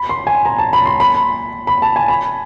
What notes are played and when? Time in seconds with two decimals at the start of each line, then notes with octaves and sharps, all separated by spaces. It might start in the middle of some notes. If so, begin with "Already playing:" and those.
Already playing: B5
0.09 C6
0.27 G#5
0.46 A#5
0.59 A5
0.73 B5
0.86 C6
1.00 B5
1.67 B5
1.82 A5
1.96 G#5
2.08 B5